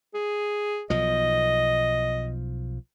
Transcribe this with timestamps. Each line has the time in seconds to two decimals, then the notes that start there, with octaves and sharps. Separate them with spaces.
0.14 G#4
0.90 B1 F3 D#5